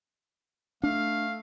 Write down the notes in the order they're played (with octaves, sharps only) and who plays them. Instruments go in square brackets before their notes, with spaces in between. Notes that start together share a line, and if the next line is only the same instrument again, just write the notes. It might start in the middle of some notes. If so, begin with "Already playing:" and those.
[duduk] A3 [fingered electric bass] D4 [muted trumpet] F5